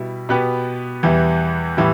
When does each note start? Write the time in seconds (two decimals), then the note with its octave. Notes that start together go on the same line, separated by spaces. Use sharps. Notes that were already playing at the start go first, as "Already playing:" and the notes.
Already playing: B2 G3 E4
0.29 B2 B3 G4 B4
1.03 E2 E3 G3 E4 G4
1.77 A2 E3 G3 E4